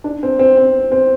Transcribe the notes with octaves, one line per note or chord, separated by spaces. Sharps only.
D4
C4
C4
C4
C4